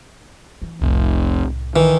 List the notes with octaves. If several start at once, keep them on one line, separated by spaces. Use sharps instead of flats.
E3
F1 C2 A2
D#3 E3